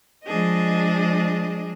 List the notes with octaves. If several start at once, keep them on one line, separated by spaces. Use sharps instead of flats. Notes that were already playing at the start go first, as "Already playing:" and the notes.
F3 G#3 D4 G#4 D#5